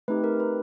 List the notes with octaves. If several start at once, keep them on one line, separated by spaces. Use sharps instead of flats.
A3 C4 D#4 G4 B4
A#4
B4